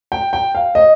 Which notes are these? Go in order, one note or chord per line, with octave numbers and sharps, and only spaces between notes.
G5
G5
F5
D#5